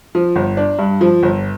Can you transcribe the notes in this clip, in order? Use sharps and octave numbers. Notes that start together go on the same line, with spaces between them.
F3
G1
D4
G2
F3
G1